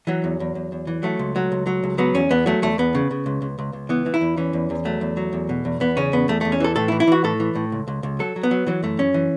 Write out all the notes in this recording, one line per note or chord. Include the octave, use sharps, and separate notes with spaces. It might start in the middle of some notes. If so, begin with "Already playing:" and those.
E3 F#3
E2
E2
E2
E2
E3
F#3 A3
C#2
F#3
C#2
F#3
C#2
F#3 B3
E2 C#4
E2 B3
F#3 A3
E2 A3
E2 B3
C#3
C#3
C#2
C#2
C#2
C#2
E3 B3
E3
E4
E2
E3 C#4
E2
E2
F#3 A3
E2
F#3
E2
B2
E2
E2 B3
C#3 C#4
E2 B3
E2 A3
E2 A3
C#4
E3 A4
A2 A4
E4
E3
E4
E3 F#4
A2 A4
E3
A2
C#2
C#2
C#2
F#3 A4
F#3
B3
F#3
E3 F#3
F#2 A3
F#2 C#4
E3